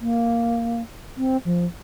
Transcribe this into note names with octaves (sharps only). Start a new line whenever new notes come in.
A#3
C4
F3